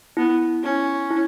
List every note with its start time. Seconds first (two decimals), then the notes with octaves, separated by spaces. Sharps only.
0.17 B3 E4
0.64 C#4 E4
1.10 E4